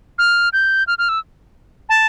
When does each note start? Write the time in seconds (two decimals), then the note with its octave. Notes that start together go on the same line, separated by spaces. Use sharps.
0.18 F6
0.53 G6
0.87 F6
0.98 F6
1.09 E6
1.89 A5